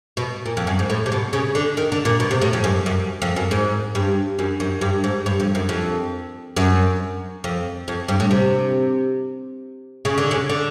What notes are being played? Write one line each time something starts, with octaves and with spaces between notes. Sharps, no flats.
B2
A#2
F2
F#2
G#2
A2
C3
B2
C#3
D3
D#3
D3
A#2
B2
C3
A2
F2
F#2
F#2
F2
F#2
G#2
G2
F#2
F#2
G2
G#2
G2
F2
F#2
F2
F#2
F2
F2
G2
A2
C3
C#3
D3
C#3
D3